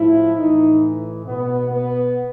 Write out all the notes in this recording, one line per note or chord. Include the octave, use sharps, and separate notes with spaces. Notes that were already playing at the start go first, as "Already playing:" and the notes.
Already playing: A2 F3 E4
A2 E3 D#4
B2 B3
B3